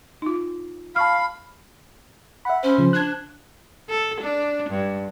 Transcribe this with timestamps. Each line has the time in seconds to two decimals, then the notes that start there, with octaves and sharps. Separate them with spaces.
0.22 D#4 F4
0.96 F5 A5 B5 C#6 F6
2.45 E5 F#5 B5
2.63 C#4 C5
2.78 C#3 F3
2.93 D4 F#6 G#6
3.89 A4
4.21 D4
4.70 G2